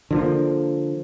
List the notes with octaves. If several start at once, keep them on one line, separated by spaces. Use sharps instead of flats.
D3 F3 A#3